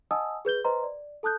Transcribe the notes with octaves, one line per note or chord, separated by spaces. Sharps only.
D#5 F#5 G#5 A5 D#6 E6
G#4 B4 G6 G7
B4 C5 D#5 A#5 C6
D5
A4 A5 D#6 F#6 G6